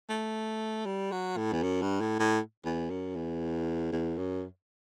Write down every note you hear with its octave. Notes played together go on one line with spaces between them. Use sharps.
A3
G3
F#3
A2
E2
F#2
G2
A2
A2
E2
F#2
E2
E2
F#2